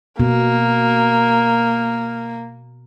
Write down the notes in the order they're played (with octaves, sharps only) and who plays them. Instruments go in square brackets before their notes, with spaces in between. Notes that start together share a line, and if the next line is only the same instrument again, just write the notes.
[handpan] B2 [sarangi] A#3